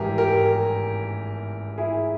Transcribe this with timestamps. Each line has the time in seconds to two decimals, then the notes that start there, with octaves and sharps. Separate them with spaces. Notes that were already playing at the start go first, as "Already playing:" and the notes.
Already playing: G#1 G2 E3 G4 G#4 A#4
0.18 G4 A#4
1.78 E4 G#4